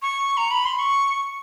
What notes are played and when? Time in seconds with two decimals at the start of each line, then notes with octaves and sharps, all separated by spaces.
0.02 C#6
0.37 A#5
0.51 B5
0.65 C6
0.79 C#6